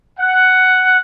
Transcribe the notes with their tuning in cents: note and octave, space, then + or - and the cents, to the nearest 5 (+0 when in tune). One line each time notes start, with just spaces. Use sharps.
F#5 +5